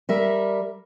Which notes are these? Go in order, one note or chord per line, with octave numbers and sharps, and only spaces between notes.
G3 A#4 E5